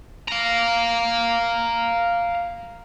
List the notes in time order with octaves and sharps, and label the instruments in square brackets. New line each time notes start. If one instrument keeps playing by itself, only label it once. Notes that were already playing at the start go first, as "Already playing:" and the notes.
[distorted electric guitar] F5 A#5